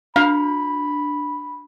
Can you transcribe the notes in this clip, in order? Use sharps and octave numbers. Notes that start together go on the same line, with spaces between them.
D4 F5 B5